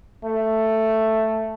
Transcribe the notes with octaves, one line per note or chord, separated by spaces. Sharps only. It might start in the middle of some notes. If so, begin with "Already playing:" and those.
A3